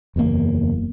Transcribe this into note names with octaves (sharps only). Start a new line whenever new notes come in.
F#1 E2 G2 A#3